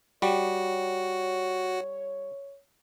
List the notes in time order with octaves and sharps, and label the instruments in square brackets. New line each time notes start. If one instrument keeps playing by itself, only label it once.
[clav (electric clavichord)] G3 [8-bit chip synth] F#4 [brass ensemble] C#5